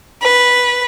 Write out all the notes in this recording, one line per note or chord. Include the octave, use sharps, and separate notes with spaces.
B4